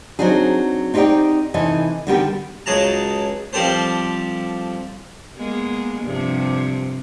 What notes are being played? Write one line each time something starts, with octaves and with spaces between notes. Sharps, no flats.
F#3 C4 D4 D#4 G#4
C4 D#4 G4 A#4 D5 G5
C3 E3 D#4 A4 D#5 G#5
D3 D#3 G3 B3 G4 G5
C#2 F#3 G#4 A5 A#5
F3 G3 C4 G4 A4 C5
G#3 A#3 B3
G2 C3 F3